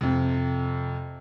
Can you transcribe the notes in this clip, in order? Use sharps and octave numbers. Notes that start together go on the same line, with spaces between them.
F2 C3